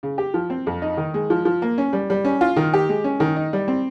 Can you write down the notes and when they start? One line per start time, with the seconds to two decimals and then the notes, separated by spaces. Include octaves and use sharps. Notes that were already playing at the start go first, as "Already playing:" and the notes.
0.03 C#3
0.18 G4
0.34 F3
0.50 C4
0.67 F2
0.82 D#4
0.97 D#3
1.14 G#3
1.30 F3
1.45 F3
1.62 A#3
1.78 C#4
1.93 G3
2.10 G3
2.25 C#4
2.41 F4
2.56 D#3
2.74 G4
2.89 G#3
3.04 C#4
3.20 D#3
3.36 D#4
3.53 G3
3.68 C4